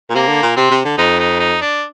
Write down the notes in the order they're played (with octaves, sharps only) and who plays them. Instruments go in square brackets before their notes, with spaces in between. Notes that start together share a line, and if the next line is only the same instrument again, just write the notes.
[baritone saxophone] A#2
[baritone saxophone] C3 [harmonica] A#3
[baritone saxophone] D3
A#2
[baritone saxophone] C3 [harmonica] C4
[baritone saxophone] C3
D3
[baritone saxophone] F2 [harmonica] D#4
[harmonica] D#4
D#4
D4